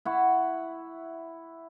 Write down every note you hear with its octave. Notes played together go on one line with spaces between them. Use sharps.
E4 F#5 C#6